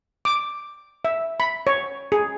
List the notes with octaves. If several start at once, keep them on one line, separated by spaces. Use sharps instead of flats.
D6
E5
B5
C#5
G#4